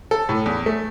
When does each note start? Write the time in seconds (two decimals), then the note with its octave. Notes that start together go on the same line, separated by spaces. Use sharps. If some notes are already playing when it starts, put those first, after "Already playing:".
0.11 A4
0.29 A2
0.46 E2
0.66 A3